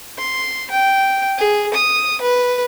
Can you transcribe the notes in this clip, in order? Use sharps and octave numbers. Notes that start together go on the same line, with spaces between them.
C6
G5
G#4
D#6
B4